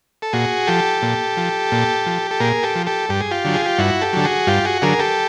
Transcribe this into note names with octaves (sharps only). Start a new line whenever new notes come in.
A4
A#2 F#4 G#4
F3 G4 A4
A#2
F3
A#2
F3
A4
A#2 G#4 A#4
G4 A4
F3
G4 A4
G2 G4
G#4
F4 G4
D3 F#3
G#4
G4
G2 E4 F#4
G4 A4
D3 F#3
F#4 G#4
G2 F4 G4
F#4 G#4
D3 F#3 G#4 A#4
G4 A4